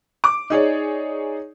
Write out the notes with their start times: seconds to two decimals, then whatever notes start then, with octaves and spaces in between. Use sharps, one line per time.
0.24 D6
0.50 D#4 G#4 C#5 D5